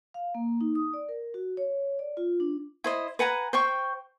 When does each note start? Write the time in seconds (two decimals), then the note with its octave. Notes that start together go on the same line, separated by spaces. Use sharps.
0.14 F5
0.35 A#3
0.61 D#4
0.75 D#6
0.93 D5
1.09 A#4
1.34 F#4
1.57 C#5
1.99 D5
2.17 F4
2.40 D4
2.84 E4 C5 D#5
3.19 B4 F#5 G#5 A#5
3.53 C5 G5 C#6